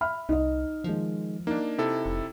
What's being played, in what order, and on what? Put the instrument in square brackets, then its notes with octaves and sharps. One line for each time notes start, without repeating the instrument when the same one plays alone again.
[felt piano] E5 B5 F6
[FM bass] C2 [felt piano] D#4 D#5
[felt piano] D#3 G#3 [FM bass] F3
[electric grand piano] A#3 D4 [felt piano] D#4
[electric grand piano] C3 E4 A4
[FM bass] F1